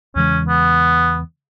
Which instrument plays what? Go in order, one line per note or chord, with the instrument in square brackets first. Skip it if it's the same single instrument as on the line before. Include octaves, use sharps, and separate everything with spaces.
[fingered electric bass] E2 C#3 E3 G#3 [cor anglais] C#4
[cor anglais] B3